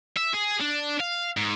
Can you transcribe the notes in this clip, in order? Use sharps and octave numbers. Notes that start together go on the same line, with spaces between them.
E5
G#4
D4
F5
G#2